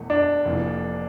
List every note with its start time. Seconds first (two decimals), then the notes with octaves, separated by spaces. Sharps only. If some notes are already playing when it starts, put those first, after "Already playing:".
Already playing: E1 E2 A3
0.10 D4
0.45 F1 F2 E3 A#3